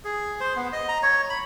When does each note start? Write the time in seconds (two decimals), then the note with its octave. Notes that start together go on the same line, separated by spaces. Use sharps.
0.04 G#4
0.40 C5
0.56 B3
0.73 D#5
0.88 A#5
1.03 C#5
1.30 B5